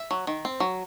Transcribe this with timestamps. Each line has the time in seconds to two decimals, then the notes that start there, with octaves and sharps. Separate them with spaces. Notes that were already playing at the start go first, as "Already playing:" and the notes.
Already playing: E5
0.11 F#3
0.27 D#3
0.45 C4
0.60 F#3